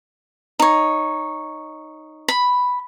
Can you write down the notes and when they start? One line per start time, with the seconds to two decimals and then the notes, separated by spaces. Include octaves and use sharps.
0.59 D#4 C#5
2.28 B5